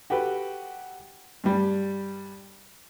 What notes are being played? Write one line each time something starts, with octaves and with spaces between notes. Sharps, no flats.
F#4 G4 A4 B4
G2 G3